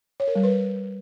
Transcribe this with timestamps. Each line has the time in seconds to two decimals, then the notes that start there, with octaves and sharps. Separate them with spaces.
0.20 C#5
0.28 A#4
0.35 G3
0.43 B4